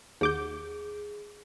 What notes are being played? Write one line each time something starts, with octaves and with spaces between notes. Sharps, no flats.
D#2 G#4 D6 G6